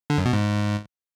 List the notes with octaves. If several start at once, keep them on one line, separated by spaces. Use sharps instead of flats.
D3
F#2
B2
G#2